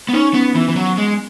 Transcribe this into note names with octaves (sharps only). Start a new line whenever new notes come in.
B3
C#4 D#4
B3 C#4
E3 B3
E3
F#3
G#3